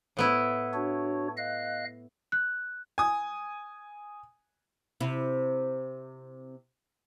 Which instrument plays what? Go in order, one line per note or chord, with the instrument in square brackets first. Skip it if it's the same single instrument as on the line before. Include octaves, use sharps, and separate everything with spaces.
[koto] A2 B3 E4
[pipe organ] D4 F#4 C#5
D#5 F5 F#6
[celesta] F#6
[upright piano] G#5 D#6
[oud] C3 E4